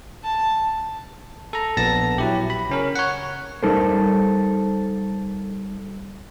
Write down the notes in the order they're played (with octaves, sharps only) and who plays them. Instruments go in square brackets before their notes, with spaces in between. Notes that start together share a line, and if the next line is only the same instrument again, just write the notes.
[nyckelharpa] A5
[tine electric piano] A4 A#5
A#1 B3 A5 A#6
F#3 E4 G4
B5
C#3 C#4 A#4
C#5 F#5
[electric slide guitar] G3 D#4 A4 A#4 C5